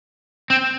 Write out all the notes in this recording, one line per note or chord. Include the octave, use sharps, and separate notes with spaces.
C4